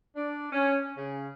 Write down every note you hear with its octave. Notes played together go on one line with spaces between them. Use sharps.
D4
C#4
C#3